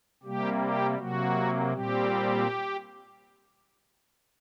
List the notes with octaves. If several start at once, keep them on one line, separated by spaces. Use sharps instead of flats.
C3 G3 A#3 G4
G4
C3 F#3 A#3 F#4
A#2 G3 C4 G4